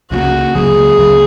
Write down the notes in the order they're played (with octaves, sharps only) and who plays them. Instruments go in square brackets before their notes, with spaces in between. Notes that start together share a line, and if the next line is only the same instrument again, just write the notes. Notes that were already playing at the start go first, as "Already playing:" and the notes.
[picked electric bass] C#2 C#3 F#3 A#3 [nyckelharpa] F#4
[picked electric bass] C#2 C#3 F#3 A#3 [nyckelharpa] G#4
[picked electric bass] C#2 C#3 F#3 A#3